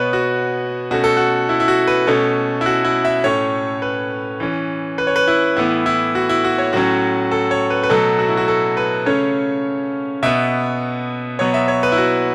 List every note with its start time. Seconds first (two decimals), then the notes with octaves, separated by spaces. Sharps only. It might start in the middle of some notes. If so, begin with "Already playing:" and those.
Already playing: B2 B3 B4 C#5
0.13 F#4
0.91 B2 A3 C#4 F#4
1.04 A4
1.17 F#4
1.49 E4
1.60 E4
1.68 F#4
1.87 B4
2.07 B2 A3 C#4 A4
2.61 E4
2.66 F#4
2.85 E4
3.05 E5
3.24 A2 A3 C#4 C#5
3.82 B4
4.40 E3 C#4
4.98 B4
5.07 C#5
5.16 B4
5.28 E4
5.57 A2 E3 B3 E4
5.86 E4
6.15 F#4
6.29 E4
6.44 F#4
6.58 C#5
6.73 A2 F#3 C#4 F#4
7.31 A4
7.51 C#5
7.70 B4
7.83 B4
7.89 B2 F#3 A3 A4
8.19 F#4
8.29 E4
8.37 F#4
8.48 A4
8.77 B4
9.06 C#3 A3 C#4 C#5
10.23 B2 B3 E5
11.39 B2 F#3 B3 C#5
11.54 E5
11.68 C#5
11.83 B4
11.92 E4
11.98 F#4